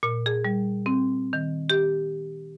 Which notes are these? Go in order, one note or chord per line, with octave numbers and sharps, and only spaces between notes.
A#2
G#4
G3
C4
D#3
G4